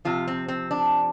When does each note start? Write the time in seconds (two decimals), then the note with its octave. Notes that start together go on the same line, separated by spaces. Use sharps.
0.05 C3 F3 F4
0.27 C4
0.48 C4
0.71 D4